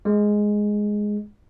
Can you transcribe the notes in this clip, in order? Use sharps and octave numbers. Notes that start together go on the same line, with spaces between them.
G#3